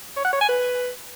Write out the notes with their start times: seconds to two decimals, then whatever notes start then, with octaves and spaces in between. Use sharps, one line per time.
0.16 C#5
0.25 F#5
0.33 C#5
0.41 G#5
0.49 B4